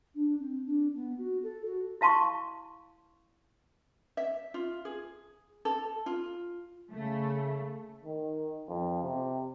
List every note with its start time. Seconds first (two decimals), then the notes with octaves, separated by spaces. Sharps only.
0.15 D4
0.40 C4
0.66 D4
0.95 B3
1.18 F#4
1.43 A4
1.66 F#4
2.01 E4 F5 A5 C6 C#6
4.17 E5
4.54 F4
4.85 G#4
5.65 A4
6.06 F4
6.92 C#3 A3
8.04 D#3
8.68 F2
9.03 C3